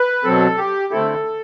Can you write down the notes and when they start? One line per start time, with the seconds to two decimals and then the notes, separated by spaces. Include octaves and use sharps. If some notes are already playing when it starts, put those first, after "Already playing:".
Already playing: B4
0.24 B2 F#3 C4 A4
0.57 G4
0.91 D3 A3 C4 E4 A4